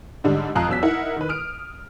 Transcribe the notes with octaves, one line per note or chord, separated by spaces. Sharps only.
G#2 D3 G3 D4
F2 F5 A5 A#5 D#6 F#6
E2 F#3 E6 B6
D#4 E4 A#4 F#5
D#3 B4
D#6 F6 D7